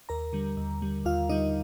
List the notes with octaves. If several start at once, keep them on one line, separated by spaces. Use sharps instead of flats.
D#2 A#4 A#5
D3 G3
D#2
D3 G3
D#2 F4 F5
D3 G3 D#4 D#5